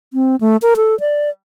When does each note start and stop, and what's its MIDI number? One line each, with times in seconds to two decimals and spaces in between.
0.14 0.36 60
0.41 0.57 57
0.62 0.74 70
0.76 0.98 69
1.00 1.30 74